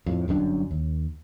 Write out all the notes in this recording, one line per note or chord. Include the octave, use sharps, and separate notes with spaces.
F2 A2
G1 F#2 C#3 D4
D#2